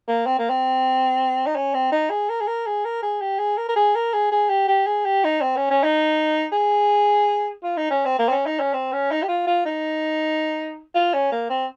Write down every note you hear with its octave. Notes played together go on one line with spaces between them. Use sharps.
A#3
C4
A#3
C4
D#4
C#4
C4
D#4
G#4
A#4
G#4
A#4
G#4
A#4
G#4
G4
G#4
A#4
A#4
G#4
A#4
G#4
G#4
G4
G4
G#4
G4
D#4
C4
C#4
C#4
D#4
G#4
F4
D#4
C#4
C4
A#3
C4
C#4
D#4
C#4
C4
C#4
D#4
G4
F4
F4
D#4
F4
C#4
A#3
C4